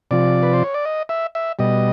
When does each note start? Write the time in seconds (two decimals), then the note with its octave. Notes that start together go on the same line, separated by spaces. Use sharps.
0.11 C3 F3 D5
0.43 B4
0.53 C5
0.64 C#5
0.74 D5
0.85 D#5
1.09 E5
1.35 E5
1.59 B2 G3 D#5